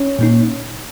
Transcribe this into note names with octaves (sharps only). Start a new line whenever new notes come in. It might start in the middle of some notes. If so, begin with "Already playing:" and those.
Already playing: C#4 C#5
A#2 A#3 D#4